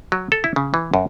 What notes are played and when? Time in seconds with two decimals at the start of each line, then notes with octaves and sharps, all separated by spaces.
0.12 F#3
0.32 A4
0.44 E4
0.56 C#3
0.74 E3
0.94 F#2